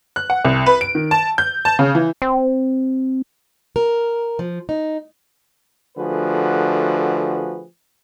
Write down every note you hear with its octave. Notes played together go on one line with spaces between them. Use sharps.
F#6
F#5
C2
B4
D7
D#3
A5
G6
A5
C#3
E3
C4
A#4
F3
D#4
D3 F3 A3 F#4 G#4 B4